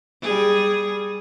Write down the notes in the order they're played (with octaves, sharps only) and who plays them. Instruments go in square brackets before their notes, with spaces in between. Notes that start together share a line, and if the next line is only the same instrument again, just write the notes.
[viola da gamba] G3 G#4